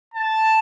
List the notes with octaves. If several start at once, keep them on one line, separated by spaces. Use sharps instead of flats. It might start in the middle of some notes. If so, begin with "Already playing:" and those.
A5